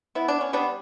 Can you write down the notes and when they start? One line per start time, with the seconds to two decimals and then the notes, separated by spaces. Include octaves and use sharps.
0.15 B3 E4
0.28 D4
0.41 C#4
0.53 G3 B3 D4